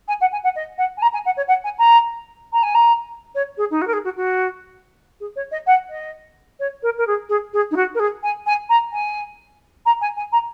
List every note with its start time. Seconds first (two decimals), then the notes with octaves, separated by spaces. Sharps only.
0.08 G#5
0.21 F#5
0.32 G#5
0.44 F#5
0.56 D#5
0.78 F#5
0.97 G#5
1.02 A#5
1.13 G#5
1.25 F#5
1.37 C#5
1.48 F#5
1.64 G#5
1.79 A#5
2.53 A#5
2.63 G#5
2.75 A#5
3.35 C#5
3.57 G#4
3.71 D#4
3.81 F#4
3.87 A#4
3.93 G#4
4.04 F#4
4.16 F#4
5.20 G#4
5.36 C#5
5.51 D#5
5.67 F#5
5.90 D#5
6.60 C#5
6.83 A#4
6.98 A#4
7.07 G#4
7.29 G#4
7.53 G#4
7.71 D#4
7.76 F#4
7.95 A#4
7.99 G#4
8.23 G#5
8.46 G#5
8.69 A#5
8.93 G#5
9.86 A#5
10.01 G#5
10.17 G#5
10.32 A#5